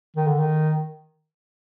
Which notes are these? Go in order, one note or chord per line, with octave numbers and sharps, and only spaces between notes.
D#3
D3
D#3